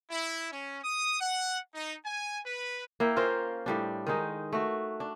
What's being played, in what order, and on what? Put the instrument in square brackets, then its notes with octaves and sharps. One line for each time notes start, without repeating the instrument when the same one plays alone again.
[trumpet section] E4
C#4
D#6
F#5
D#4
G#5
B4
[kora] A#3 E4 G5
C#4 F4 A#4 C5
A2 G3 D4
D#3 G#3 D#4
A3 F#4
D4